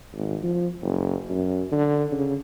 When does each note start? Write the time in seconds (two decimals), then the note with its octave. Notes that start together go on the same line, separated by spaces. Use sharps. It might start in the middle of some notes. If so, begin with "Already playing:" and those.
0.14 G#1
0.43 F3
0.82 F#1
1.30 F#2
1.72 D3
2.12 C#3